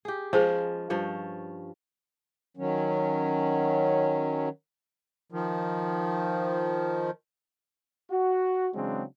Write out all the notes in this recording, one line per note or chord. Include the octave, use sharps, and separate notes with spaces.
G4 G#4
F3 G#3 C#4 G#4 C5
G2 F3 C#5
D#3 F#3 C#4
D#3 F3
F#4
C#3 E3 F#3 G#3 C4 D4